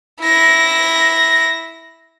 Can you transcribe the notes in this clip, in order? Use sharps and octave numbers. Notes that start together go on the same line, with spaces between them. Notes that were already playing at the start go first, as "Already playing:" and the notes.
E4 A#6